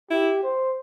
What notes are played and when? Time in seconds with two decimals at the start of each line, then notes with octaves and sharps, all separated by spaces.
0.11 E4 G4
0.43 C5